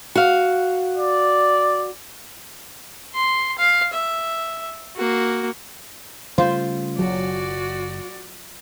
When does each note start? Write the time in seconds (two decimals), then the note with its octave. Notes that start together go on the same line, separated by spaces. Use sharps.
0.15 F#4 F5
0.97 D5
3.15 C6
3.58 F5
3.93 E5
4.96 A#3 F#4
6.38 C#3 G3 A3 F4 C5
6.99 F#1 F#3 F#4 D5